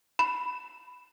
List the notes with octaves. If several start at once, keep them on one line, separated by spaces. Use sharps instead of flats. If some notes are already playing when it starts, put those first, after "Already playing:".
B5